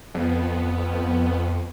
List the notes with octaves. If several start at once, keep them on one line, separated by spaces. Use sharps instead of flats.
F2 B3